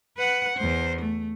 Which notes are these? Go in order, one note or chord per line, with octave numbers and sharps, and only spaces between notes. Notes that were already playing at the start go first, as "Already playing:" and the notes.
B4 F#5
E2 C5
A3